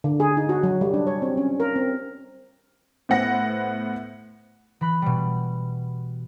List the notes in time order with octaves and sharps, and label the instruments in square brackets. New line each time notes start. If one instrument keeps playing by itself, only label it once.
[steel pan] D3
G#4
D#4
F#4
F#3
G3
D4
C#5
C4
C#4
A#4
C4
[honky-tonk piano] A2 B3 C5 F#5 A#6
[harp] E3 B5 F#6
B2 G3